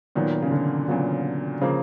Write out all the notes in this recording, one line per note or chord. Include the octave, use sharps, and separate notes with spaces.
A#2 D#3 F#3 B3
C#3
D3
A#2 C#3 F#3 B3
C#3 F3 A#3